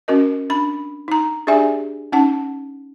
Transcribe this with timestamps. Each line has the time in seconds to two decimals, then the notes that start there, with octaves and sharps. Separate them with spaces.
0.08 C#4 F#4 A#4 D#5
0.50 D4 B5
1.08 D#4 A#5
1.47 D4 G4 G#4 D5 E5 G#5
2.12 C#4 D#4 F#5 A5